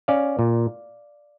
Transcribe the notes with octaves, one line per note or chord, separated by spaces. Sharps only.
C#4 D5 F5
A#2